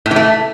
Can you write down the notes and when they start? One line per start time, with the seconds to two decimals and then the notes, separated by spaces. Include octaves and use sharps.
0.06 A2
0.11 E3
0.16 A3